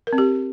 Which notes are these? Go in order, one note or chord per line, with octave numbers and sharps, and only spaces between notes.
A#4
C4
G4